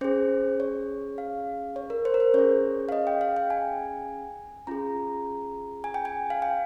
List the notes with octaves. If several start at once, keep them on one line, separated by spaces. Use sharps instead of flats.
C#4 G#4 C5
C#5
F5
C#5
A#4
C5
A#4
C5
C#4 G#4 C#5
F5
D#5
G5
F5
G5
G#5
C#4 F4 G#4 A#5
G#5
G5
G#5
F5
G5